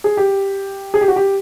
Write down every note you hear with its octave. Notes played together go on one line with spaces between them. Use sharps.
G#4
G4
G#4
G4
F#4
G4